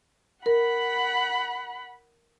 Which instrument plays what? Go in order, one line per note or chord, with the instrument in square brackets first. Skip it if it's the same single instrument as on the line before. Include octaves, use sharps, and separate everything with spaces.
[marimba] A#4 [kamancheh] F#5 B5